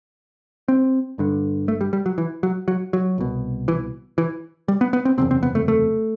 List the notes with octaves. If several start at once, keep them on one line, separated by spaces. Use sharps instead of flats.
C4
G1 G2 D3
A3
G3
G3
F#3
E3
F#3
F#3
F#3
C2 B2
E3
E3
G3
B3
B3
C4
F#1 E2 C3 C4
C4
B3
A3
A3